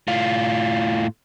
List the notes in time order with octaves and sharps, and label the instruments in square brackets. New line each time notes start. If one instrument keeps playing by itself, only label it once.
[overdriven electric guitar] A2 F4